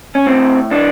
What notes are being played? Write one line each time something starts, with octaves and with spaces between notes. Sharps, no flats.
C#4
A2 C4
E3 D4